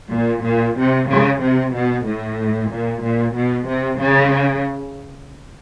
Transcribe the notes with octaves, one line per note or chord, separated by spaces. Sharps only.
A#2
A#2
C3
C#3
C3
B2
A2
A#2
A#2
B2
C3
C#3